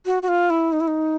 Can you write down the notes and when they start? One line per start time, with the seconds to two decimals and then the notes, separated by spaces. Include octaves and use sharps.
0.06 F#4
0.22 F#4
0.28 F4
0.50 E4
0.72 D#4
0.80 E4
0.87 D#4